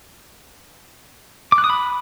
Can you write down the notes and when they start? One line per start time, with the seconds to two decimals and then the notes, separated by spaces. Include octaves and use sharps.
1.52 D6
1.58 F#6
1.64 D#6
1.70 B5